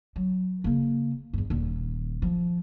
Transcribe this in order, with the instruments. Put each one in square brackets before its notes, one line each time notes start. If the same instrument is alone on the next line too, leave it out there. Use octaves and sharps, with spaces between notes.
[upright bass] F#3
C#3 A#3
E2 G2
D#1 D#3
F3